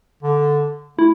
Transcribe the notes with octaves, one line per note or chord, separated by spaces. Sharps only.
D3
A3 E4